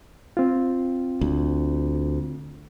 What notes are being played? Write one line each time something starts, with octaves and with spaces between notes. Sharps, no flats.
C4 F4
D2